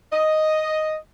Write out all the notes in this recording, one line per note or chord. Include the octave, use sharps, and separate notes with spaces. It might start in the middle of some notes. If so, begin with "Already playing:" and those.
D#5